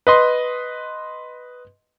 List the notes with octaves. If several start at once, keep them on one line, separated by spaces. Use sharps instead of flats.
B4 D#5 C6